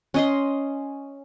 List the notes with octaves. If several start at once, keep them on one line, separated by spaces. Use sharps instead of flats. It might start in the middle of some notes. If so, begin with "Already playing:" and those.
C#4 D#5 C6